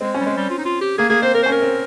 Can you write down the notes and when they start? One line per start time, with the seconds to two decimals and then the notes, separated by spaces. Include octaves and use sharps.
0.01 G#3 C4
0.14 C#4
0.21 G3
0.26 G#3 C4
0.37 G3
0.50 F4
0.58 D#4
0.65 F4
0.81 G4
0.98 A#3 G#4
1.09 A#3 G#4
1.22 C4 C5
1.34 C4 A#4
1.43 C#4 C5
1.52 A#4
1.62 C4